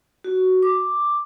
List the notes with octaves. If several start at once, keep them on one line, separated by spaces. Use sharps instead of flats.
F#4
D6